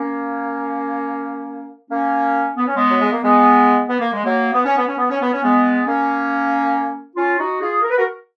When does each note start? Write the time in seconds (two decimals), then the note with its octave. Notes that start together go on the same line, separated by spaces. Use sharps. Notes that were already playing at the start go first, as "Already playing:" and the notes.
Already playing: A#3 C#4
1.90 A#3 C#4
2.57 B3
2.67 C#4
2.75 G#3 B3
2.89 F#3
3.00 G#3
3.12 A#3
3.23 G#3 B3
3.88 B3
4.00 A#3
4.12 G#3
4.25 F#3 A#3
4.53 B3
4.65 C#4
4.76 B3
4.87 C#4
4.98 B3
5.10 C#4
5.21 B3
5.33 C#4
5.43 G#3 B3
5.86 A#3 C#4
7.16 C#4 F4
7.39 D#4 F#4
7.61 F4 G#4
7.82 A#4
7.90 B4
7.97 F#4 A#4